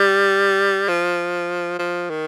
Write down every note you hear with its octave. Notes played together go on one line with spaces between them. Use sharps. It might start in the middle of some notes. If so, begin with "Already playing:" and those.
Already playing: G3
F3
F3
D#3